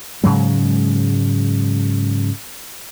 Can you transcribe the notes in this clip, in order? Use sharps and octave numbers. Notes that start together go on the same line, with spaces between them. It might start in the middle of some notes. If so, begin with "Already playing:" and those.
G#2 C#3 F#3 G#3